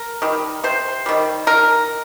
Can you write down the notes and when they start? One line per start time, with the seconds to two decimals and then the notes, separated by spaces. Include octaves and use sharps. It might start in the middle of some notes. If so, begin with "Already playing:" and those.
Already playing: A#4
0.22 D#3 G3
0.64 C3 C5
1.06 D#3 G3
1.47 D#3 A#4